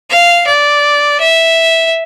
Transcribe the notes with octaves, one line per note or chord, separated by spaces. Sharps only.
F5
D5
E5